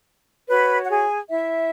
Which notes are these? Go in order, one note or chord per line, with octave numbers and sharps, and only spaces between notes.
F#4 B4 C#5 B5
F#5
G#4 G#5
E4 E5